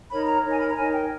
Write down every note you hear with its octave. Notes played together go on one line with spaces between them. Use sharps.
D#4 A#4 C#5 B5
A#5
D#4 A#4 C#5
G#5
B5
A#5
D#4 A#4 C#5 G#5
G5